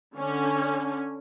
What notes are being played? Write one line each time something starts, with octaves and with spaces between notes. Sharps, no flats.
D3 C#4